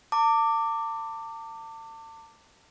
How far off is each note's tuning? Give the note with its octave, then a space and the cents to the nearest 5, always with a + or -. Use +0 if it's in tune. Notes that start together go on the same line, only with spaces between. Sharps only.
A5 +40 D6 +0